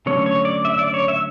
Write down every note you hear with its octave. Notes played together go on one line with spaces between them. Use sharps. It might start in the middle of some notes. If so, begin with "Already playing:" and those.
D3 F#3 A3 C#4 C#5
C#5
D5
E5
D5
C#5
E5